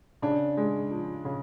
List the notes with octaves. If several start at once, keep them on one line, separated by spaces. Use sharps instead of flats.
C#3 D4
G#3
F3
C#3